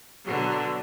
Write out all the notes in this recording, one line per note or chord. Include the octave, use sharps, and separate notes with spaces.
B2 D3 F#3